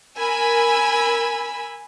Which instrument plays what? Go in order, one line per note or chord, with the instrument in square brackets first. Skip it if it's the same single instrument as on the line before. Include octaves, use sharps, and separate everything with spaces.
[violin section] A#4 G#5 B5 E6